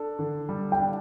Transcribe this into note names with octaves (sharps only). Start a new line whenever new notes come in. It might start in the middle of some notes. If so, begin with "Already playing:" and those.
Already playing: D4 A4
D3
G3
G5
D4